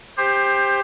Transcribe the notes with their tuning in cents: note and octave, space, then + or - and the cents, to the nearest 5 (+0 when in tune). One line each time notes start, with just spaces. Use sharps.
G4 +20 C5 +10